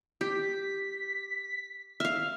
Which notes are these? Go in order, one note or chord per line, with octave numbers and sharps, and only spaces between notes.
G4 B6
E5 F5 F6